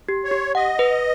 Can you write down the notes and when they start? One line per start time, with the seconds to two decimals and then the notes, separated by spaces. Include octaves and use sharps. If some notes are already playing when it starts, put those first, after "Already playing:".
0.09 G4
0.24 C#5
0.31 G4
0.55 D#5 F#5
0.79 B4